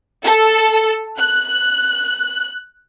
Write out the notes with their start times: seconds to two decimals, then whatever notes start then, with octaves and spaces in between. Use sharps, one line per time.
0.24 A4
1.17 F#6